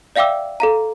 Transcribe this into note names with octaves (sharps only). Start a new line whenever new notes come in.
D5 E5 F5 G5 D6 E6
A4 F5 A#5